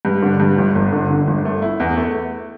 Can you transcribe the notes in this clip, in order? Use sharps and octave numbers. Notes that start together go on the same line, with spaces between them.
G2
D3
G2
G1
G1
D3
D3
G1
A3
E4
E2
A3